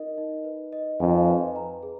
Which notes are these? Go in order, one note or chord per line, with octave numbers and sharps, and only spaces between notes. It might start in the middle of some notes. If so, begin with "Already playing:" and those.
Already playing: D#4 A#4 D#5
D#4
B4
D#5
F2 G#5
B4
A#5
G#4